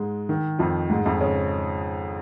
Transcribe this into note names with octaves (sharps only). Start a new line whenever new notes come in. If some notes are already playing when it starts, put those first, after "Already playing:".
Already playing: G#2 G#3
D#3
F2 F3
G#2 G#3
F2 F3
C#3 C#4